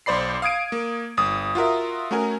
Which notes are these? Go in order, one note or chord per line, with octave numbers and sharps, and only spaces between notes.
B1 C5 D5 B5 C7
F5 D#6 G#6 D7 D#7
A#3
G1 D#6
F4 F#4 A#4 E5
A3 C#4 F#4 A#4 G#5